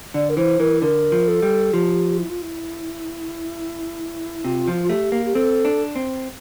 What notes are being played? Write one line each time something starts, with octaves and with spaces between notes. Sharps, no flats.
D3 D5
A#4
E3 C5
E3 A#4
D3 A#4
F3
A4
G3
F3 G4
E4
F4
E4
C3 F4
F3
A3 G4
A#3
G4
C4 A4
D4
C4